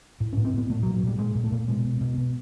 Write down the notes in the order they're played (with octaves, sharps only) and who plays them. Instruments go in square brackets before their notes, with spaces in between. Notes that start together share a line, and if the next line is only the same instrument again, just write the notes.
[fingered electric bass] A2
A2 C#4
C4
A2 B3
A#2 A3
F#3
A#2
F#3
A#2 G3
A#2 G#3
A#2
A3
A#2
B2 G#3
B2
B2
B2